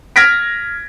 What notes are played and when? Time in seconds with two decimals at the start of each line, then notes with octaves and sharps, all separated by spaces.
0.16 F6 G#6 A#6 B6 D7